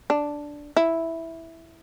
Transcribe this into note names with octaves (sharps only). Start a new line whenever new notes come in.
D4
E4